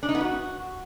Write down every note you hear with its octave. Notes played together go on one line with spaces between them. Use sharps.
D4
D#4
B3
F#4